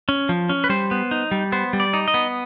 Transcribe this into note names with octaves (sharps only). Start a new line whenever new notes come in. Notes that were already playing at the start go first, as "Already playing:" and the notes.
C#4
F3
C#4
B4
G3 C5
B3
D#4
G3
B3 C5
G3
D5
D#4
D#5
B3